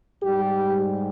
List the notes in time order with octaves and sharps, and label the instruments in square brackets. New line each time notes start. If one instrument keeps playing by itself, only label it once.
[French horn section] G#2 G3 G4